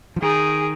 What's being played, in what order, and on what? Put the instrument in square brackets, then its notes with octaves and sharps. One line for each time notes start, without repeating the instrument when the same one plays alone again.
[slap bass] F3
[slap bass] D#3 [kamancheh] G#4